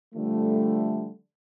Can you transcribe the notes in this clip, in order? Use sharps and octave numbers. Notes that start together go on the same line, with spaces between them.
D3 F3 G3 A3